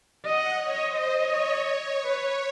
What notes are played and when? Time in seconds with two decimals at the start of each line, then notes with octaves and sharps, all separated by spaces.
0.25 D#5 F#5
0.55 C#5
0.70 D#5
0.85 C5
1.14 C#5
2.04 B4